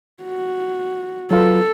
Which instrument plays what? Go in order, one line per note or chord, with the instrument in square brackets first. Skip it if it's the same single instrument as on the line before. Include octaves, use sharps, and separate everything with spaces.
[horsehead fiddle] F#4
[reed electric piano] F#3 F4 B4 [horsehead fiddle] A4